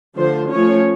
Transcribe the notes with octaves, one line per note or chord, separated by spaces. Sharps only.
D3 F3 A3 C5
F3 A3 C#4 C#5